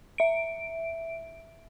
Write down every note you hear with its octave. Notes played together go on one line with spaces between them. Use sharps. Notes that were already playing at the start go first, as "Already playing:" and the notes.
E5 D7